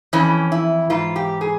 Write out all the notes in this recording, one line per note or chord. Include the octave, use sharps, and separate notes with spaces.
F2 E3 C#4
E4
G#2 E3 F4
G4
G#4